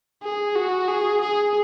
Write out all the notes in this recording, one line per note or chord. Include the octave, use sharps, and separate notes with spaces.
G#4
F#4
G#4
G#4